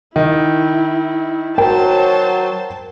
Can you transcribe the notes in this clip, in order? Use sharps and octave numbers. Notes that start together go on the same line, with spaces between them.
D#3 E4
F#3 A#4 C5 G5 A5